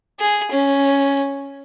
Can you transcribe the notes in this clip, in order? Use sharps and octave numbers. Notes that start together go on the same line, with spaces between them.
G#4
C#4